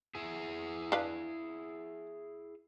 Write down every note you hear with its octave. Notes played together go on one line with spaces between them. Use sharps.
E4 G#4
D4 B4 F5